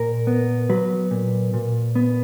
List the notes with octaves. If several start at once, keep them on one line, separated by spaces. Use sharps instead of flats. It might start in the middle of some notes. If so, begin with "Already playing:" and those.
Already playing: A#2 A#4
B3
F#3 B4
A#2
A#2
B3